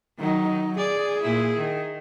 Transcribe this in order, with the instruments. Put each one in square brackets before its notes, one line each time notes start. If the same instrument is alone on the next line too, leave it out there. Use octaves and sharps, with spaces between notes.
[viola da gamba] D#3 [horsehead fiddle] F#3 D#4
[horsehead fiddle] G#4 [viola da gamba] D5
[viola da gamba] A#2 E4
D#3